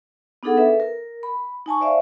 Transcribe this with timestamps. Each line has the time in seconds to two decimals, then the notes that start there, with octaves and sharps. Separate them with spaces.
0.43 B3 D4 D#4 G#4 A4 F#5
0.57 A4 B4 E5
0.80 A#4
1.23 B5
1.66 D#4 G#5 A5 C#6
1.81 C5 D5 E5 F5